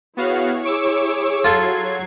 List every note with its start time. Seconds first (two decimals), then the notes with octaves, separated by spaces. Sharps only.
0.17 B3 E4 F#4 G#4 C#5 F5
0.63 C#6 D6 E6
1.44 F#3 F4 A4 G#6 C7